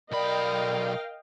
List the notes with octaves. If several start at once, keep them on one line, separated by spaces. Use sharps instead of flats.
B1 A#4 D5 D#5 F5 G5 B5